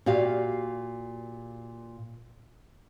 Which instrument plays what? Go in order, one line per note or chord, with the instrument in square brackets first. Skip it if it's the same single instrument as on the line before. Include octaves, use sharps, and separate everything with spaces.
[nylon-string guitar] A#2 F#4 G4 F5